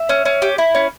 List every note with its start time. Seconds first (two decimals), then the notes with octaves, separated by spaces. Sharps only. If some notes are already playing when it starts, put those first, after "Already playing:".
Already playing: E5
0.09 C#4
0.26 C#4
0.42 G4
0.58 E4
0.75 C#4